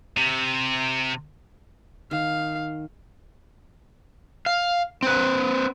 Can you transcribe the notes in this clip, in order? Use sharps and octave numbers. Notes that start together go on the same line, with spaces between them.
C3
D#3 F5
F5
C4 B4